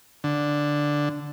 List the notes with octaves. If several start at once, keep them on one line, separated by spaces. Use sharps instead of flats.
D3